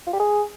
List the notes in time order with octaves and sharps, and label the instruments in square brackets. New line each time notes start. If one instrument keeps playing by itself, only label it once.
[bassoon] F4
G4
G#4